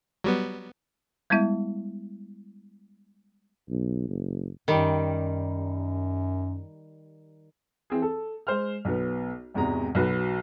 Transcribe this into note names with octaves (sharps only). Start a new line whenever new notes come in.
F#3 G3 B3
G3 G#3 B3 E4 E5
B1
F#1
F#2 D#3 G3
E3 C4 G#4
A4
G#3 C5 F6
B1 B3
G#1 E2 C3 G#3 A#5
B1 F#4 B4